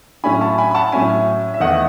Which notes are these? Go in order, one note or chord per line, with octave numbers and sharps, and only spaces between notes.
A2 F#3 C#4 E4 G#5 B5
A5 C#6
G#5 B5
B5
F#5 A5
A2 F#3 C#4 E4 E5 G#5
E5
E2 D#3 A3 D#5 F#5